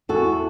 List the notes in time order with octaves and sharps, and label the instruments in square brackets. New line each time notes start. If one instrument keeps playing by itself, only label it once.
[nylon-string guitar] E2 F#4 A4